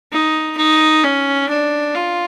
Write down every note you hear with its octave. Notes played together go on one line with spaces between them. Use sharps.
D#4
D#4
C#4
D4
F4